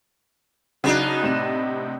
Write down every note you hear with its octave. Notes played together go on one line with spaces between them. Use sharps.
C#3 F#3 B3 D4 D#4
A2 C3 E7